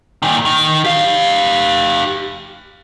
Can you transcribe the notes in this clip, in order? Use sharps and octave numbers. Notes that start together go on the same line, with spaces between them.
A#2 D#3
D#3
G4 F5